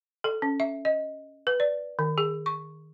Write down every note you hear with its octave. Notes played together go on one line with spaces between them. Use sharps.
A4
C#4
E5
D#5
B4
D5
D#3
G#4
C#6